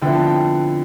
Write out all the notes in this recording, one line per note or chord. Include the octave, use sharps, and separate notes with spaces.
D3 F3 B3 E4 G5
A5
G5